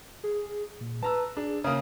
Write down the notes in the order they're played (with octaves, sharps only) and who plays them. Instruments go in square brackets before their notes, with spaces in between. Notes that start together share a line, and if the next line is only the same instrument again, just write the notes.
[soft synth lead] G#4
A#2
[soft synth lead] B4 [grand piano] A5 A#5 E6
[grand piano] D4 [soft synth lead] G#4
[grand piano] C#3 A#3 [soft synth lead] D#6